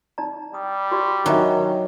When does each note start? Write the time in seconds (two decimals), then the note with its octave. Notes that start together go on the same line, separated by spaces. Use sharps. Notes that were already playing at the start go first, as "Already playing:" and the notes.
0.18 D#4 D5 A#5
0.54 G3 D#6
0.91 F#4 G4 D5
1.26 D#3 F#3 D4 D#5 E5